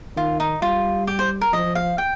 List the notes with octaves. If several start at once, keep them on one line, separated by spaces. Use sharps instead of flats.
D#3 F4
D#4
G3 F4
G4
C5
A#4
F3 D#5
F5
G5